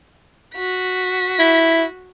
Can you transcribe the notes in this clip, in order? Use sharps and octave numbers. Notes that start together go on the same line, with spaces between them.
F#4 B6
E4